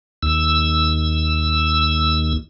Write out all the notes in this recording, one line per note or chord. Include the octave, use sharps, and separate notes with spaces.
D#2 E6